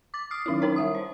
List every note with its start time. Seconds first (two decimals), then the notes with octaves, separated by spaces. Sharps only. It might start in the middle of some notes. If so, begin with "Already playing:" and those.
0.14 D6 A6
0.31 D#6 F6 C7
0.46 D#3 F#3 C#4 D#4 E4
0.62 C#4 D#4 A#4 C#5
0.76 G3 E5 D#6
0.95 C5